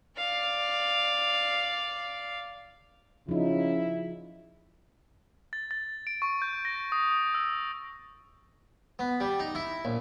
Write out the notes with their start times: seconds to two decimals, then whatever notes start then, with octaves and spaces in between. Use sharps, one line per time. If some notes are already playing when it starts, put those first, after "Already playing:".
0.17 D5 F5
3.29 C#3 F3 D#4 E4
5.53 A6
5.71 A6
6.07 D7
6.22 C#6
6.42 G6
6.65 A#6
6.92 D#6
7.35 E6
8.99 B3
9.20 G3
9.40 D#4
9.55 E4
9.85 A#1